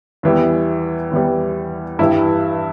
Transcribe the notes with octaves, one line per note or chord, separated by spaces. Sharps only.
E2 E3 G3
E2 E3 G3
G2 E3 G3 E4